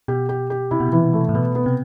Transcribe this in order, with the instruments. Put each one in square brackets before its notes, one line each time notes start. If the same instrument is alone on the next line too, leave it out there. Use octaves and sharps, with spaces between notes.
[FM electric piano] B2 [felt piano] G4
[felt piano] G4
G4
[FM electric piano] C3 [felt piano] E4
[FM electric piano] B2
[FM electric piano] C3 [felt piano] E3
[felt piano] A3
[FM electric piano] A2
[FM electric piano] B2 [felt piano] B3
[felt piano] B3
[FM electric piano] C3